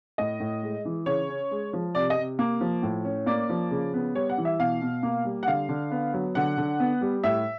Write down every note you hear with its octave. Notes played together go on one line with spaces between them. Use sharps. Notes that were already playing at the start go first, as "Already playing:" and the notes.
A2 D#5
A2
G#3
E3
C#3 C#5
C#4
G#3
F3
C3 D5
D#5
C3
A#3
F3
A2
C#4
A#3 D5
F3
C#3
B3
G3 C#5
F#5
E3
E5
B2 F5
B2
A#3
G3
F#5
D3 F5
D3
B3
F#3
D3 F#5
D3
B3
G3
A2 E5